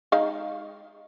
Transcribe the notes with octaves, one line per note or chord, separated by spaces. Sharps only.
G#3 D#4 F5